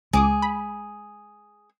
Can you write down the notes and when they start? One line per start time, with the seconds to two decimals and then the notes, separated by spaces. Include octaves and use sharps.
0.13 C#2 G#3 G#4 D6 D#6
0.42 B5